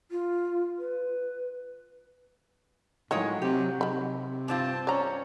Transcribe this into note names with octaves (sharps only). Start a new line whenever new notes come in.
F4
B4
A2 D#3 F#3 G#3 F4 C#5
C3 G4
C3 D#3 B5
G2 C4 F4 A5
C#4 C#5 D5 A#5